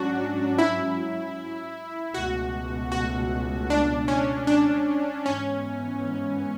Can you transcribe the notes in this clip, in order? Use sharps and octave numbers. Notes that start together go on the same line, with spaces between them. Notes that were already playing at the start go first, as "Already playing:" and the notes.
Already playing: G#2 F#3 C#4 D4 F#4
E4
C#2 B2 A3 F#4
F#4
D4
C#4
D4
G#2 E3 B3 C#4